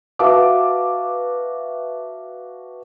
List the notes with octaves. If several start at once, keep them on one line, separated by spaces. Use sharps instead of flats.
F#4 B4 E5 F5 A5 D6